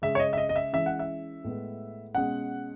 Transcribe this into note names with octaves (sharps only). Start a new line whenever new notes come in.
C#3 G#3 C#4 E5
C#5
D#5
E5
D#5
D#5
E5
E3 G#3 C#4 E5
F#5
E5
A2 G#3 B3
B2 G#3 C#4 F#5